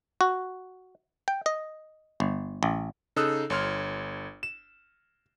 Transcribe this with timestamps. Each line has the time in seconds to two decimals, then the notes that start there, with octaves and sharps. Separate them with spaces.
0.21 F#4
1.28 G5
1.46 D#5
2.20 G1
2.63 A1
3.16 C#3 D#4 A4 D#6 E6 F#6
3.50 G1 C#5 C6 F6
4.43 E7